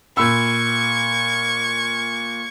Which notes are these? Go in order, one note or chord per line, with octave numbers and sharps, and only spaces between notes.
A#2 B5 C#6 E6 G#6